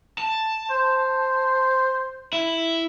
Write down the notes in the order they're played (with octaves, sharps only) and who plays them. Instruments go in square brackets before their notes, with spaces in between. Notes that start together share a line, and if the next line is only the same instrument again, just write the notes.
[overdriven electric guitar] A5
[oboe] C5
[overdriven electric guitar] E4